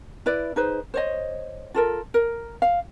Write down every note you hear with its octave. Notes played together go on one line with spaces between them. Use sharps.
E4 B4 D5
D#4 G#4 B4 C5
C5 C#5 D#5
F4 A4 A#4
A#4
F5